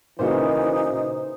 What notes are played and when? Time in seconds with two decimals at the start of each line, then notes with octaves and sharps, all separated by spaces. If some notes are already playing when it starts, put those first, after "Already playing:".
0.19 A#2 C#3 E3 D#4 F#4 C5